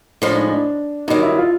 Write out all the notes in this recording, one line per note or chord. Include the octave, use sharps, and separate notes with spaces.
A2 F3 G#3 D4
D#4
D4
G2 D#3 F#3 D#4
E4
F4